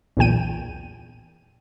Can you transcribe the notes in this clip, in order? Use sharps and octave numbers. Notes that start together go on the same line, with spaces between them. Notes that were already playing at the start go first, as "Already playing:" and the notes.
B1 E2 A#2 G5 D#7